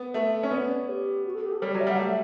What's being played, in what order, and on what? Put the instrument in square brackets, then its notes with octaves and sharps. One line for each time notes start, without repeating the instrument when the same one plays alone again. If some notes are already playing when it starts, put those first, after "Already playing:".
Already playing: [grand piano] B3
[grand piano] A3 [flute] E5
[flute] E5
[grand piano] C#4
[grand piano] B3 [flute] D5
[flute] C#5
G4
F#4
A4
G4
A4
[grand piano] G3 [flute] C#5
[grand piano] F#3 [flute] D5
[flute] E5
[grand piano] G3 [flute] F#5
[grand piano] A3 [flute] E5